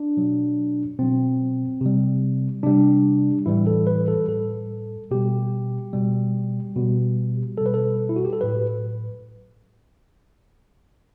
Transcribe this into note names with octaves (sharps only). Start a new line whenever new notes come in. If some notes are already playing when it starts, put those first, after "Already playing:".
Already playing: D4
B2 F#3
B2 F#3 C4
C3 G3
C3 G3 D4
A2 E3 G3 E4
A4
B4
A4
A2 G3 A4
B2 G3 G4
B2 G3
B2 G3
B2 G3 A4
B4
A4
E4
F#4
G4
A4
A2 F#3 B4